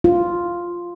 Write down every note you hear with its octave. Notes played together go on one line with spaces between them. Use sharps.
F4